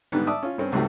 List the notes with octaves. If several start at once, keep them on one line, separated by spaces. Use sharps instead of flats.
G#2 D3 D#3 G3 B3 D#4
D5 E5 A5 D6 D#6
C#4 F4
G2 C4 C#4
C#2 G#2 G3 A3 C4 F#4